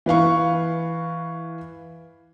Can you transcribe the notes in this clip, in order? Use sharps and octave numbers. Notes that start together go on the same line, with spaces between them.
E3 B4 F5 C#6